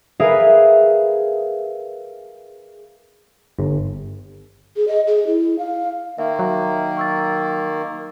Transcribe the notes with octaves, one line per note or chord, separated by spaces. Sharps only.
G#4 A#4 B4 E5 F5
G1
G#4
D#5
G#4
E4
F5
D#3 A#3 E5 F5
F#3
C#6 E6 A6